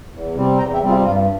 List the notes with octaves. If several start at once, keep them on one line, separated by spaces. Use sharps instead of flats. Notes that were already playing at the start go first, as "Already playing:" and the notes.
E2
C3 G3 C4
E2 G5 A#5
E5 G5
C3 G3 C4
F4 G#4
G2 F4